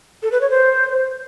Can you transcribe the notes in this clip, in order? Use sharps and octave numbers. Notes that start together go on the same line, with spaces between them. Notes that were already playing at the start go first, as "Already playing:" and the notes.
A4
B4
C#5
C5